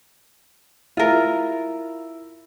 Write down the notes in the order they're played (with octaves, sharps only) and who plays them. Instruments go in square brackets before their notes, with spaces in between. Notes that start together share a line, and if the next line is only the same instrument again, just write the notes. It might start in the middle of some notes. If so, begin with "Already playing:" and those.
[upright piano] E4 [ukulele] F4 A#4